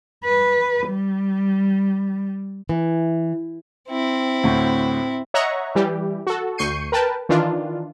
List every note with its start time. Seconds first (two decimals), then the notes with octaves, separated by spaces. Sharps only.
0.24 B4
0.88 G3
2.69 E3
3.88 C4 E4
4.43 D2 A2
5.34 C#5 D#5 E5 F#5 A#5 C#6
5.75 E3 G3 G4
6.27 F#4 A4
6.58 D2 C#6 G6 C7 C#7 D#7
6.92 A#4 B4 G5 A5
7.29 D#3 E3 D4 F4